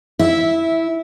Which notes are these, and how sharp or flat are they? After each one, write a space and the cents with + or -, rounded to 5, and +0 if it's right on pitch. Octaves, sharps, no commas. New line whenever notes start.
E4 -5 E5 -15